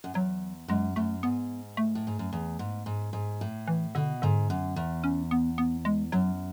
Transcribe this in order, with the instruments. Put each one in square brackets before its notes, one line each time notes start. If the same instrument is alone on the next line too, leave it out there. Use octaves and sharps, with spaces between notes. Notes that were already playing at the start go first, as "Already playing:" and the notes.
[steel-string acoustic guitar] F#2
[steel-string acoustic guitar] E2 [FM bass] F#3
[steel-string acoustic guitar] F#2 [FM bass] G#3
[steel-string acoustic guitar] F#2 [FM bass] A3
[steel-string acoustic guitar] G#2 [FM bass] B3
[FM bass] A3
[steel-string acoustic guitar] A2
G#2
F#2
E2
G#2
G#2
G#2
A2
[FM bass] E3
[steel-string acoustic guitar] B2 [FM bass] D3
[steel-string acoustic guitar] G#2 [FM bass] D3
[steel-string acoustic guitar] F#2
E2
[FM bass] C#4
B3
B3
G#3
[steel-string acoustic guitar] F#2 [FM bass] F#3